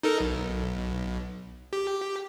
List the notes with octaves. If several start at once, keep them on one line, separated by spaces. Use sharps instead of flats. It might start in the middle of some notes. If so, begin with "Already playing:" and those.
D#4 A4 A#4
B1
G4